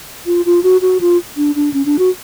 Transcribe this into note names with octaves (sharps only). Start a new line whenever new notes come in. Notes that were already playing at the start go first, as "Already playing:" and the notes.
F4
F4
F#4
F#4
F4
D4
D4
C#4
D4
F#4